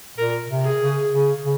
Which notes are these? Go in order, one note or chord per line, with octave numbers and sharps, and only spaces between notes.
A#2 A#4
C3
G#4
C#3
C#3
C#3